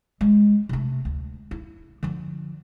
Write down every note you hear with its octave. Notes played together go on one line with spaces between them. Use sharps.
G#3
C3 A3
D2
E4
D3 F3